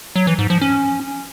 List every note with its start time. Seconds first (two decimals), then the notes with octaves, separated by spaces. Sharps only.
0.16 F#3
0.27 E3
0.39 G#2
0.50 F3
0.61 C#4